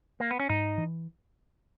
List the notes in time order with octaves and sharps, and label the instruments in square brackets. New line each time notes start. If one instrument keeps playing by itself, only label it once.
[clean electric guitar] A#3
B3
C#4
[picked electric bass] G#2 [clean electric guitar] D#4
[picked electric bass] E3